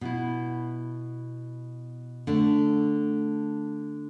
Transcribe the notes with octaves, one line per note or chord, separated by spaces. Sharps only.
B2 B3 E4
D3 A3 D4